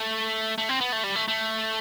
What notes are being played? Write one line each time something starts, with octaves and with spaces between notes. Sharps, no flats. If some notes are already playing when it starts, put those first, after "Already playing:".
Already playing: A3
A3
C4
B3
A3
G3
A3
A3